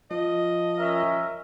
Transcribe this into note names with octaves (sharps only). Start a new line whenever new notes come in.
F3 D#5
C#4 A#4 E5